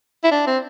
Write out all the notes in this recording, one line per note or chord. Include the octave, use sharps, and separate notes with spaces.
E4
D4
C4